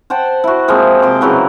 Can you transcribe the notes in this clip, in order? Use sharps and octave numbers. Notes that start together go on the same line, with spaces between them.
C5 F#5 G5 A5
E4 F#4
F3 G#3 A#3 C4
C3 C6 D6
C#3 E3 F#3 E4